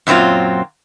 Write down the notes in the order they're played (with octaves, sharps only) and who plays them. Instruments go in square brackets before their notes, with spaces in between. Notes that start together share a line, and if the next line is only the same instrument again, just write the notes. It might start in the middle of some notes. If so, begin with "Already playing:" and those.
[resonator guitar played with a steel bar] F#2 A#2 F#3 C4 F4